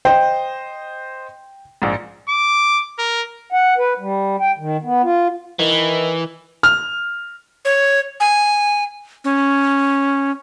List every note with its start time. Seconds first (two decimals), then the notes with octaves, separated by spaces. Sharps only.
0.05 C5 D#5 G5
1.82 A#1 G#2
2.29 D6
2.99 A#4
3.52 F#5
3.78 B4
3.99 G3
4.40 G5
4.58 D#3
4.83 B3
5.03 F4
5.60 D#3 E3
6.63 F6
7.65 C#5
8.20 G#5
9.24 C#4